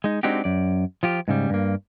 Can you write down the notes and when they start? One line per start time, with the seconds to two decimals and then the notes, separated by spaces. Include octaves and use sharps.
0.04 G#3 D#4
0.23 G#3 C4 D4 D#4 F#4 G4
0.44 F#2 D5
1.03 F3 F4 G4
1.28 G#2 C#3 G3
1.50 G2 A#3